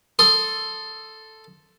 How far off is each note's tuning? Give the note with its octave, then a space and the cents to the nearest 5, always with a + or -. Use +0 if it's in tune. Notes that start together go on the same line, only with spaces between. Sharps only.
A4 +0 C6 +0 D#6 +0